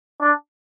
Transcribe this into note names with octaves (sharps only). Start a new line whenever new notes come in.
D4